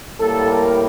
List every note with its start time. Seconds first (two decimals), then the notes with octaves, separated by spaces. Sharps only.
0.19 A2 G3 A#3 A4
0.49 A#4